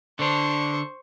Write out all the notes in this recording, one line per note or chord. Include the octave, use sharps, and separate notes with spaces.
D3 D4 C5 C#6